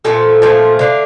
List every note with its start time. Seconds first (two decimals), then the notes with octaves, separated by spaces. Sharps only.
0.05 A#2 F3 A3 A4
0.42 A#2 F3 A3
0.79 D3 A3 F5